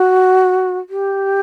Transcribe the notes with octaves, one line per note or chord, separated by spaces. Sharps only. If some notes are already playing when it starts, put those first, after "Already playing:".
Already playing: F#4
G4